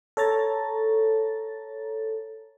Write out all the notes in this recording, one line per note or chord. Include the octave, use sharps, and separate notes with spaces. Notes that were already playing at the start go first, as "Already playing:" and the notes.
A4 C#5 A#5 A6